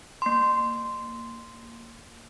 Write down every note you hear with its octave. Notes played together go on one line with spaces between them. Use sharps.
A#3 C6